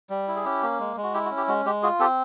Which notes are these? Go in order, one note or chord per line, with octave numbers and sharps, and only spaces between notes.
G3
E4
G#4
C#4 G4
A#3
G#3
G#3
F#4
E4 G4
F#4
C#4
G4
G#3 F#4
G#3 G4
F4 F#4 G#4
C4 G4 A4